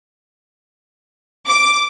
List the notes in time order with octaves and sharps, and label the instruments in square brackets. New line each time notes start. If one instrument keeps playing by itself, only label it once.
[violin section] D6